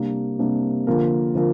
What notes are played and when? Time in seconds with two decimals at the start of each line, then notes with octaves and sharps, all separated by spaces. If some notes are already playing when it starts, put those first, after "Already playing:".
Already playing: C3 G3 A#3 D4
0.39 C3 G3 A#3 D4
0.87 D3 F3 A#3 F4 A#4
1.35 D3 F3 A#3 F4 A#4